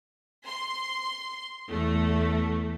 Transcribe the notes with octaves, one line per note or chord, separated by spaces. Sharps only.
C6
E2 A3